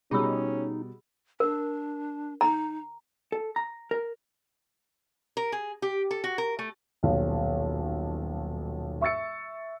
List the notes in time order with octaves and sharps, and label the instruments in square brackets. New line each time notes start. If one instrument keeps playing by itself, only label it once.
[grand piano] B2 G3 [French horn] C#4 [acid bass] D#4 [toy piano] G#4 B5 E6
[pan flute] D4 [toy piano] A#4
[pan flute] D#4 [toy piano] A#5
[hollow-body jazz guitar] A4
A#5
A#4
[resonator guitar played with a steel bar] A#4
G#4
G4
A4
F#4
A#4
A3
[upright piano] D#1 B1
E5 C#6 E6 A6 C#7